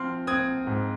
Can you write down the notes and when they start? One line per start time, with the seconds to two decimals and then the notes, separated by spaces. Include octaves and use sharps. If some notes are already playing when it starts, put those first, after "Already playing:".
Already playing: F3 C4 C6 F6
0.27 C4 D#6 G#6
0.67 G#2